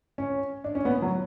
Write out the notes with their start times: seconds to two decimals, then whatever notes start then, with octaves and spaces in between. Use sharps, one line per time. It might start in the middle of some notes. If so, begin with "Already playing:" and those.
0.18 C#4
0.64 D4
0.75 C#4
0.85 B3
1.02 F#3